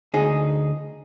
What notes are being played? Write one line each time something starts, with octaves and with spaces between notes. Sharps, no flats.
D2 D#4 G#4